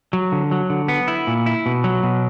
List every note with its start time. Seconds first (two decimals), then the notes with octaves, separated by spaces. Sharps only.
0.13 F#3
0.32 D3
0.51 F#3
0.70 D3
0.88 B3
1.08 E4
1.27 A#2
1.46 E4
1.66 B2
1.84 F#3
2.03 B2